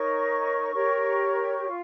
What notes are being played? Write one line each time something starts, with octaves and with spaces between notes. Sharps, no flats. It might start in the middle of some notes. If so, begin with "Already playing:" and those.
Already playing: D#4 A#4 C#5 C#6
G4 A#4 C#5
F4